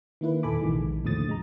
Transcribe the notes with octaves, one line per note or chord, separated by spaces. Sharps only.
D#3 A#3 E4 B4
D#2 A#2 A4 G#5 B5 D6
A#1 C3 D#3 E3 G#3
D#2 A2 D3 F3 D#6 A6
G#3 A#5